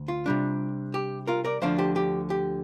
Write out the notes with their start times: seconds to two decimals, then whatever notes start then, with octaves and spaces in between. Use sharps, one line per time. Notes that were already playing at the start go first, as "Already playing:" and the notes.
Already playing: D2
0.08 F4
0.26 C3 G3 D4
0.94 G4
1.27 F4 A#4
1.44 A#4 D5
1.62 D2 D3 F3 D4 C5 F5
1.78 G4 C5
1.96 G4
2.30 G4